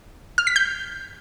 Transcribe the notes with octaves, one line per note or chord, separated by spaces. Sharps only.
F6
B6
G6